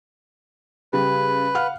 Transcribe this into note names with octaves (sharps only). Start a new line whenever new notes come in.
C#3 G3 B4
F5 F#5 F6